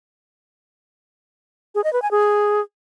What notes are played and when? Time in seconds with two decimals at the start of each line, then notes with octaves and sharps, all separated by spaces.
1.75 G#4
1.84 D#5
1.93 B4
2.02 G#5
2.11 G#4